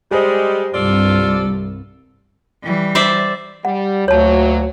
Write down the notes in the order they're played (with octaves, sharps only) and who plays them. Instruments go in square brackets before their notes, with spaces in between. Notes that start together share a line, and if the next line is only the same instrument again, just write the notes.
[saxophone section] G3 G#3 [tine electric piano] G4 C5
[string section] C2 G2 [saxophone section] F4 A4 D5
[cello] E3 G3
[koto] C5 D5 E5
[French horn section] G3 [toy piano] F#5
[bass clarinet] D2 [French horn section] A#2 F#3 [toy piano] C#5 A5